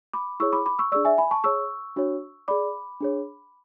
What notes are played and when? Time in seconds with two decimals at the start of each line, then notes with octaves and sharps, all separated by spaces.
0.13 B5 D6
0.40 E4 G#4 C#5 C#6 E6
0.53 B5 D6
0.66 B5 D6
0.79 C#6 E6
0.92 D4 G#4 D5 C#6 E6
1.05 E5 G#5
1.18 G#5 B5
1.31 A5 C#6
1.44 G#4 C#5 C#6 E6
1.96 D4 F#4 C#5
2.48 G#4 D5 B5 D6
3.00 D4 G#4 C#5